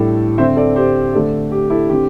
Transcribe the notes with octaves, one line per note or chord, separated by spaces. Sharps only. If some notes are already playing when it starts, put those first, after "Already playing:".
Already playing: A2 G3 D4 A4
D3 C4 C5 E5
A4 D5
G4 C5
D3 A3 D4
G4
E4 A4
D3 C4 G4